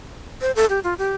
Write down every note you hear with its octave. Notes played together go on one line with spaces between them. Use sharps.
C5
A4
G4
F4
G4